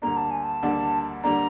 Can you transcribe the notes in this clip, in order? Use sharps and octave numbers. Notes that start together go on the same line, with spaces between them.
D2 D3 G3 A#3 D4 A#5
A5
G#5
A5
D2 D3 G3 A#3 D4
D3 G3 A#3 D4 A#5